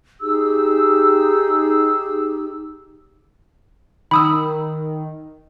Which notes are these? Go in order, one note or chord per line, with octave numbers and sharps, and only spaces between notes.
D#4 G4 G#4 E6
D#3 B5 D#6 E6